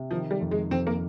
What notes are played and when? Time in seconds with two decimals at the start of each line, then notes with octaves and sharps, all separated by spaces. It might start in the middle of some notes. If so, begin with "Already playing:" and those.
Already playing: C3
0.11 D#3 F3
0.31 G3
0.41 F2
0.51 G#3
0.71 F2 C4
0.87 A#3